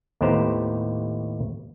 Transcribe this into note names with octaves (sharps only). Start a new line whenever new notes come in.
D#2 A2 B3 G4 C5 A#5